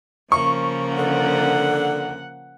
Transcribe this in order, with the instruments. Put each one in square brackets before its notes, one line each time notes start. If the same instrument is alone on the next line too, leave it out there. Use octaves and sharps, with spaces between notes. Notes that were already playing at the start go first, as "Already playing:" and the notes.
[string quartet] C#3 F3 A#3 [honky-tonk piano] C#6
[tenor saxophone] D3 [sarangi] F#5